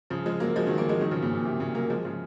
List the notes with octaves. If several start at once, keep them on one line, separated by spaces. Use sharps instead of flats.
C#3 F3
F3 G#3
F#3 A#3
F3 G#3
D#3 F#3
F#3 A#3
F3 G#3
D#3 F#3
C#3 F3
A#2 C#3
A#2
C3
A#2 C#3
F#3 A#3
F3 G#3
C#3 F3